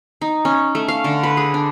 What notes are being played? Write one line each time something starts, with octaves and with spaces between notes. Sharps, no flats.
D#4
C#4
A3
F5
D3
B4
G#4
D4